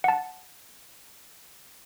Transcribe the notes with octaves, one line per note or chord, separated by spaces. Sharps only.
F#5 A5